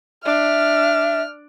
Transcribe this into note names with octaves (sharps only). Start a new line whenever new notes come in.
D4 E5 F6